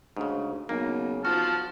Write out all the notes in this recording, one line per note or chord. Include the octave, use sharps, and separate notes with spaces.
D2 G#2 C#3
B1 C#3 A#3
B1 F3 F4 F#4 A5 F6